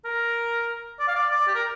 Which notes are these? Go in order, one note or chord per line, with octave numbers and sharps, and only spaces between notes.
A#4
D5
F5
D5
D5
G4
A#4